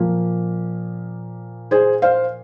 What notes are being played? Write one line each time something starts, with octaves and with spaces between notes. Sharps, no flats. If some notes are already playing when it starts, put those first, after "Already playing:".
Already playing: A#2 F3 A#3
G#4 C5
C5 F5